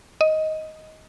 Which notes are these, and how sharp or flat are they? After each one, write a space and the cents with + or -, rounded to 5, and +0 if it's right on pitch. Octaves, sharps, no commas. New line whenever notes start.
D#5 +10